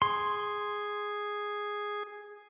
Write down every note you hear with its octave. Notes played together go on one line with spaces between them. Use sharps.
G#4 C6